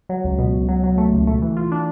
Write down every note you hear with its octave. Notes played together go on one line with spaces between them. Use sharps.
F#3
C#2
B2
C#2
F#3
F#3
A3
C#2
A3
E3
F4
D4